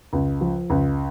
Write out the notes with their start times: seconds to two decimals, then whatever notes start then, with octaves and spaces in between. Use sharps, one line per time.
0.13 C#2
0.41 F3
0.70 C#2